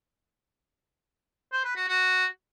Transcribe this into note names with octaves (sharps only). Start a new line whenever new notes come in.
C5
B4
F#4
F#4